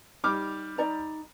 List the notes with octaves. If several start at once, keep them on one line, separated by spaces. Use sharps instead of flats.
G3 D#4 D6 F6
D#4 D5 A#5